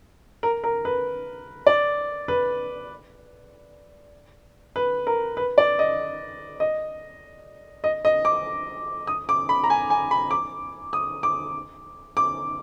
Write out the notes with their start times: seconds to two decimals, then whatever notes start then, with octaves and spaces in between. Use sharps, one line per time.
0.43 A#4
0.64 A#4
0.85 B4
1.67 D5
2.28 B4
4.76 B4
5.07 A#4
5.37 B4
5.58 D5
5.79 D#5
6.60 D#5
7.84 D#5
8.05 D#5
8.25 D6
9.07 D#6
9.29 D6
9.49 B5
9.64 A#5
9.70 G#5
9.90 G#5
10.11 B5
10.31 D6
10.93 D#6
11.23 D6
12.17 D6